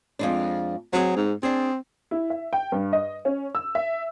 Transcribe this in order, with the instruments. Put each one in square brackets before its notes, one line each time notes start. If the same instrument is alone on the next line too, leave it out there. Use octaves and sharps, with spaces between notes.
[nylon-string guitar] F2 G#3 D4
[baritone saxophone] F#3 [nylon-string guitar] C4 G#4
[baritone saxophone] G#2
[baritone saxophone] C4 [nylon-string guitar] D4 G#4
[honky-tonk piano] E4
E5
G5
G2
D#5
C#4
E6
E5